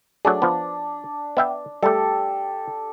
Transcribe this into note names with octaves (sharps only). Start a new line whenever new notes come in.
F#3 A3 D4 G#4
F3 B3
B3 E5 G5
G3 A3 G4 A4